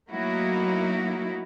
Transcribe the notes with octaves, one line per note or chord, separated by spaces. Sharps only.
F#3 A3 A#3 D#4 E4 F#4